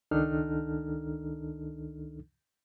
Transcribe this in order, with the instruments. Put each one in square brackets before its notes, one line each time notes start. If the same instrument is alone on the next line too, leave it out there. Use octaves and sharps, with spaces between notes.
[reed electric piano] C#2 D#3 D4 D#4 A4 F6